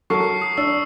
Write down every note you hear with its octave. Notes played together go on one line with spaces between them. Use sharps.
F#3 A4 A#4 C#6 C7
D#6 C7
D4 E6